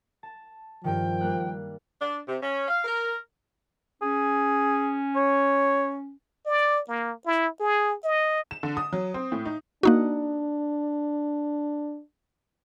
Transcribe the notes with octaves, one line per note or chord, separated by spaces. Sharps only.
A5
G2 D#3 F3 G5
G3 A#3 F#6
D4
C3
C#4
F5
A#4
C#4 G#4
C#5
D5
A#3
E4
G#4
D#5
E7
D3
D#6
F#3
C4
A2
D#4
A#3 D4 D#4 F#4